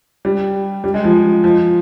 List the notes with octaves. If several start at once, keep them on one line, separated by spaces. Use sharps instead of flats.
G3
G3
G#3
F3
F3